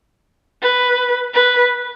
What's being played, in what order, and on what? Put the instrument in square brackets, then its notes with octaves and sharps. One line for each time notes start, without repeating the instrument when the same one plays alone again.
[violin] B4
B4